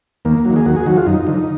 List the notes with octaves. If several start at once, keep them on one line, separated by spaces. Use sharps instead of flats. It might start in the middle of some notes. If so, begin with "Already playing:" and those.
D#2 A#3
F#3
D#3
G#4
D#2 F#4
G#4
D#3 F#3 F#4
F4
F#2 D#4
D3 F3